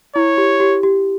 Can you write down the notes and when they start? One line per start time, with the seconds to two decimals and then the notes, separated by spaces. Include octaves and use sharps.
0.16 E4 C#5
0.38 G4
0.60 G4
0.83 G4